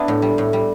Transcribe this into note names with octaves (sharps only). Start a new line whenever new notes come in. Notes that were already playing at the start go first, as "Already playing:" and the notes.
Already playing: B3 D4 E4
A2
G3
A2
G3